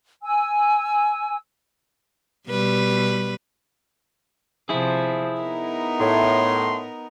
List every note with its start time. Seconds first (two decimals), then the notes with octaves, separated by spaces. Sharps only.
0.22 G#5 E6
2.49 B2 G3 B4
4.69 C3 F3 E4 G#4
5.41 B3 D#4 A#4
6.00 A2 C6